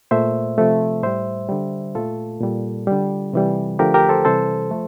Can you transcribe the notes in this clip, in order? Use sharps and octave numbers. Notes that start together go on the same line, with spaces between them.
A#2 A3 C5 E5
C3 F3 A3
A2 G3 C5 E5
D3 G3
A#2 A3 F4 A4
A#2 G3
D3 G3
C3 E3 G3
D3 F3 A3 G4 A#4
G4 A#4
A4 C5
C3 E3 G3 A4 C5
F3 A3